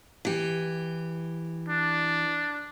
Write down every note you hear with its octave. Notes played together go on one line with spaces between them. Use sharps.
E3 G4
D4